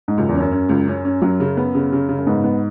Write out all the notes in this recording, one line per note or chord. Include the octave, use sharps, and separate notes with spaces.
G#2
C#2 F#2
E2
C#4
F#2
C#4
C#2
C#4
C#4
F#2 F#3
C#3
B3
C#3
C#3
C#3
F#2
G#2 B3
B3